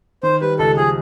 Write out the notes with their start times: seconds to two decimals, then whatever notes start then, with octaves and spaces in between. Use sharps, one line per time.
0.23 D#3 C5
0.41 G3 B4
0.59 C#2 A4
0.77 F3 G#4